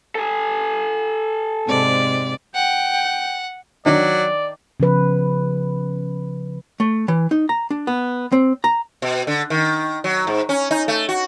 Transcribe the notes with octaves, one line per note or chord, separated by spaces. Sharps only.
A4 G#5
G#2 C3 D5
F#5 G5
D#3 F#3 D4 D5
C#3 F3 B4
A3
E3
D#4
A#5
D4
B3
C4
A#5
B2
D3
D#3
F#3
G#2
C#4
D#4
A3
F#4